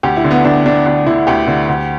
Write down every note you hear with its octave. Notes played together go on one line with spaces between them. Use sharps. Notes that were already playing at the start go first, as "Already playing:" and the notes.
D2 G4
E4
D3
B3
D2 D4
D3 D4
D2 D4
D3 E4
D2 G4
D3
D2